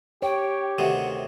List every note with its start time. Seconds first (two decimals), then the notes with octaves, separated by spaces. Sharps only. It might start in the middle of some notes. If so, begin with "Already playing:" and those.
0.22 G4 C#5 G5
0.78 D2 C3 D#3 F#5